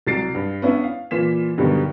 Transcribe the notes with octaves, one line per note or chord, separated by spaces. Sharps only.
C2 F#3 A6 C7 D7
G2
B3 C#4 D4 E4
F5
A#2 E3 F4 B6 E7
G2 B2 D3 D#3 F#3 G3